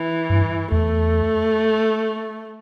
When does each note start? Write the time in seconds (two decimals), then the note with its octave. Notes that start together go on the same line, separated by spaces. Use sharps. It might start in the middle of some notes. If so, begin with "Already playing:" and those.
Already playing: E3
0.30 G2
0.71 E2 A3